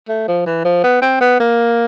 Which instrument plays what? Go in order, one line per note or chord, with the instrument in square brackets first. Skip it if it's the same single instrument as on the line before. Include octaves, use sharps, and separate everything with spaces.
[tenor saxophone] A3
F3
E3
F3
B3
C4
B3
A#3